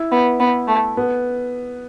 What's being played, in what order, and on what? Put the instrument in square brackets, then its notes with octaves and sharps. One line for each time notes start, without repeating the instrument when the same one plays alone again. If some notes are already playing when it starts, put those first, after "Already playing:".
Already playing: [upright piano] E4
[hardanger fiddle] B3
B3
A3
[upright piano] B3